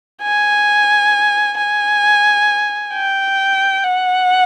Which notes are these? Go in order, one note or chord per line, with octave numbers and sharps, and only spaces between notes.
G#5
G#5
G5
F#5